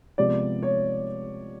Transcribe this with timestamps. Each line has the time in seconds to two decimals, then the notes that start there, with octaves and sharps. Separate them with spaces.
0.18 C3 F3 G#3 B3 D5
0.63 C#5